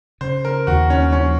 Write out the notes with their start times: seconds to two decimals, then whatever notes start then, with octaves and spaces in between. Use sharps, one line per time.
0.21 C#3 C5
0.45 A#4
0.67 D#2 F#4
0.90 C#4
1.12 F3 C#4